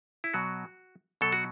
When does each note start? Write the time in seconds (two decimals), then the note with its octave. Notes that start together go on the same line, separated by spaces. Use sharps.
0.24 E4
0.34 B2 F#3 F#4
1.21 B2 F#3 A4
1.32 F#4